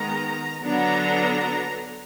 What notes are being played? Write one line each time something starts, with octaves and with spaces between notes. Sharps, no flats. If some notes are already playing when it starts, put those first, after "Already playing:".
Already playing: D#3 G#3 B3 A#5
D3 F#3 B3 D4 A#5